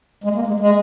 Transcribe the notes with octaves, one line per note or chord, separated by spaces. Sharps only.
G#3
A#3
G#3
G#3